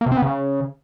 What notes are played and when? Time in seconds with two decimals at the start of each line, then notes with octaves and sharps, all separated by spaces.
0.01 A#3
0.06 C3
0.12 C4
0.17 B3
0.22 C#3